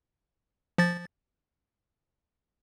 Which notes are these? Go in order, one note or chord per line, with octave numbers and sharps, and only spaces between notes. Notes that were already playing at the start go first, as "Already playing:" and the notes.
F3 A6